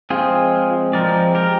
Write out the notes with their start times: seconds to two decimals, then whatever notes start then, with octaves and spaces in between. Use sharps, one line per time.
0.10 F3 G#3 C4 F4 G#4
0.93 F3 G#3 C4 A#4 D5
1.35 G4 A#4